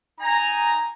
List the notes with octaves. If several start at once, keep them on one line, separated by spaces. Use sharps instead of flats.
D#4 G#5 A#5